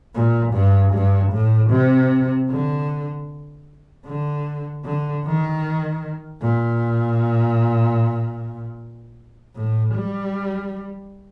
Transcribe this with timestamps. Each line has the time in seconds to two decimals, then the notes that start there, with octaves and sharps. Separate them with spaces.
0.15 A#2
0.54 G2
0.94 G2
1.33 A2
1.71 C3
2.50 D3
4.06 D3
4.85 D3
5.25 D#3
6.41 A#2
9.56 A2
9.94 G3